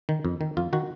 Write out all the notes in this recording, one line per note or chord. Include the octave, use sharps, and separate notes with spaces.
D#3
F2
D#3
F2 F4
D#3 F#4